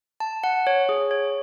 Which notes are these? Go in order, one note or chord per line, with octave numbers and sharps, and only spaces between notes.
A5
F#5
C#5
G#4
C#5